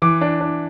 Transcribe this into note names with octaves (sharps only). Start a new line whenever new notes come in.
E3 D6
D4
D4